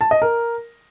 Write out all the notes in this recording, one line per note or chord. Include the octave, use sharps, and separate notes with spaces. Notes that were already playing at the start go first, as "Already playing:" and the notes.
A5
D#5
A#4